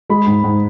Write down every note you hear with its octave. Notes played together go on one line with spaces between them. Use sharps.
G#3 B5
G#2
G#2